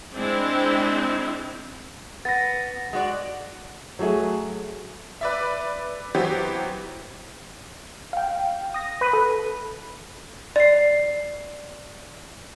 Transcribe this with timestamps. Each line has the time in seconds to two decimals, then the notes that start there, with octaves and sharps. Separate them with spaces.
0.14 G#3 C4 D4 E4
2.25 B3 A6 A#6
2.93 G#3 F#4 D5
3.99 F#3 A3 G#4 E5
5.21 B4 D5 E5
6.15 E3 F#3 B3 C4 G4
8.13 F5 G5
8.74 D#6 A#6
9.01 B4
9.13 A4
10.56 D5 C7